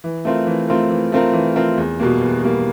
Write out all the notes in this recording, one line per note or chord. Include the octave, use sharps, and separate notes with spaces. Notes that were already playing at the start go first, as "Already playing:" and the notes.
E3
A3 C4 F4 A#4
E3
A3 C4 F4 A#4
E3
A3 C4 F4 A#4
E3
A3 C4 F4 A#4
E2
B2 G3 A#3
E2
B2 G3 A#3